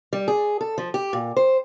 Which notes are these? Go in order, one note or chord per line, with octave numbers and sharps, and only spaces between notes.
G3
G#4
A4
F3
G4
A#2
C5